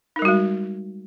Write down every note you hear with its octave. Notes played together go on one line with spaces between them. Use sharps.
G3 G#3 D#4 F#4 A#4